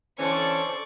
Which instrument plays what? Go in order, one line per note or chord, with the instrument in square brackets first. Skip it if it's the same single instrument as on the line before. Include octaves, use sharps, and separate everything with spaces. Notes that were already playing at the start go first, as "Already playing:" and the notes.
[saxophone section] D3 E3 C#4 [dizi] A4 [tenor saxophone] C5 [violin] D5 C#6